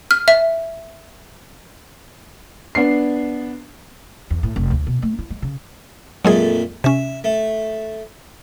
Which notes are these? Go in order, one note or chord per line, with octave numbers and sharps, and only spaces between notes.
F6
E5
B3 D4 C7
E2
A2
F1
D2
B2
A3
E4
G#3
C#3
F2 A#2 F#3 G#3 A3 G#4
C3 C#4 E5
A3